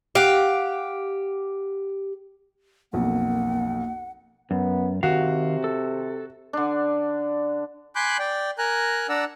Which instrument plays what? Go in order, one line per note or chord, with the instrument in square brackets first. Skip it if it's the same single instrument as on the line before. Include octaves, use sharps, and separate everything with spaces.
[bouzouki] G4 [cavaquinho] F5 F#5
[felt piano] B1 F2 [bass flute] A#3 [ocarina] F#5
[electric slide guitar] F#2 [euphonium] B3
[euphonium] C3 [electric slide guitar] D#3 F5 [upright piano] F#4
[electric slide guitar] A4
[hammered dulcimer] D3 D4
[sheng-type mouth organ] G#5 B5 C6 D6 F#6 G6
D5 G5
A#4 G#5 A#5 F#6
D4 D5 F#5 A#5 E6